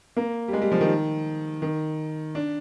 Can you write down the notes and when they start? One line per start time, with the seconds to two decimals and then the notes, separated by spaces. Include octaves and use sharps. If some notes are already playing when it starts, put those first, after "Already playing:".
0.17 A#3
0.48 G3
0.53 G#3
0.62 G3
0.72 F3
0.81 D#3
1.62 D#3
2.35 D4